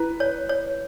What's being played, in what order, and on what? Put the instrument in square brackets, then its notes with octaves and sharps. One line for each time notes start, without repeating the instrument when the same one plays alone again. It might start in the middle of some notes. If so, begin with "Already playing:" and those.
Already playing: [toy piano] E4 [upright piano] B4
[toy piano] C#5
C#5